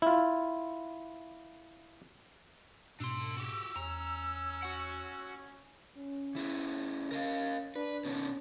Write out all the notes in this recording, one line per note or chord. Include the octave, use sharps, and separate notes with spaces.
E4 F4
G#2 B2 D4 C6 E6
F#4 G4
E2 C#4 A#5
F#4 F#5
C#4
C#3 E4 G#4
A#4 D#5 F5
D4 B4
B2 D#3 C#4 D4